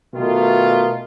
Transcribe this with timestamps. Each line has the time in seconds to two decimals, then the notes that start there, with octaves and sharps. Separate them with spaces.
0.14 B2 D#3 A3 F4